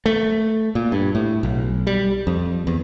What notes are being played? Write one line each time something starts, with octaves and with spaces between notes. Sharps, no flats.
A3
A#2
G2
A2
B1
G3
F2
E2